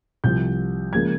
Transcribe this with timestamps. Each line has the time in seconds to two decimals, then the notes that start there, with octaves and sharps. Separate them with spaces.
0.24 C2 C3 F3 G6
0.93 C#2 C#3 F3 A#3 G#6